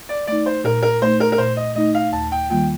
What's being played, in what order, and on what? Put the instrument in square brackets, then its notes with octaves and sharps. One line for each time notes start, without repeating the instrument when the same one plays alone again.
[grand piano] D5
[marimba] A3 D#4 [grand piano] D5
[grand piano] C5
[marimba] A#2 [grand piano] A#4
[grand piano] A#4
[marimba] A3 D#4 [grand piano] C5
[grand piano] A#4
A#4
[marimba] A#2 [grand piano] C5
[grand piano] D#5
[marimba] A3 D#4 [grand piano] D#5
[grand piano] F5
[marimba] D#2 [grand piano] A5
[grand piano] G5
[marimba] D#3 G3 A#3 F4 [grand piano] G5